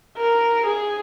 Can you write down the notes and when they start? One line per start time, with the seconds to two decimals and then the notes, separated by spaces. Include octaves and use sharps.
0.17 A#4
0.66 G#4